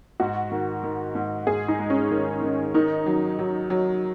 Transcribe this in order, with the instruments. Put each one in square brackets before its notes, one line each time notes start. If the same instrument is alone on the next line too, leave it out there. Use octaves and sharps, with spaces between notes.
[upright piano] G#2 [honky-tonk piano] F#4
[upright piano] D#3
D#3
G#2
[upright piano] G#2 [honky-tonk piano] G#4
[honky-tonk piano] D#4
[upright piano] G#3
[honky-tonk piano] C#4
[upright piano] D#3
D#3
[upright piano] D#3 [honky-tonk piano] D#4
[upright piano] F#3
F#3
F#3